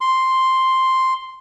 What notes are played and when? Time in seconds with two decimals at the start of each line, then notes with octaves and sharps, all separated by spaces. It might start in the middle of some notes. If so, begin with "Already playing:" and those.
0.01 C6